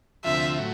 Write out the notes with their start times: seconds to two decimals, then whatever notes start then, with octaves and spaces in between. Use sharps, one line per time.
0.24 D2 C3 F3 E5
0.59 A2 F#3